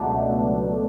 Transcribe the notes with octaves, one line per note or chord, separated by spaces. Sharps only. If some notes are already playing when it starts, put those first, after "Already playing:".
Already playing: C#2 B2 F#3 A3 D4